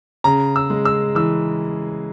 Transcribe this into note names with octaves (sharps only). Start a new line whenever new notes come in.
C#3 A#5
E6
G#3
E6
E3 E6